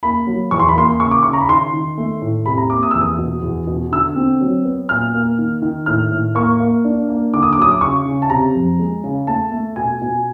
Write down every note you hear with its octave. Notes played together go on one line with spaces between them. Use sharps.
A#3 B5
F#3
E2 C#6
C6
B5
A#3 C6
C#3 C#6
D6
C#3 C#6
A#5
B5
D#3 C6
D#3
A3
A2
C3 B5
A#5
A#3 D6
D#6
E2 E6
D#6
B2
E2
B2
D3 E6
C4
F#3
B3
A#2 F6
A#3
D#3
D#3
A2 F6
A2
A#3 C#6
A#3
D4
A#3
D3 D6
D#6
D6
F#3 D#6
D6
C#3 C#6
C#3
A5
C3 A#5
F2
G#3
C#3
A3 A5
A3
B2 G#5
B2